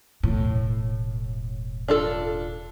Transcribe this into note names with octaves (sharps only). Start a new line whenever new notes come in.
E1 A2
D4 F4 A4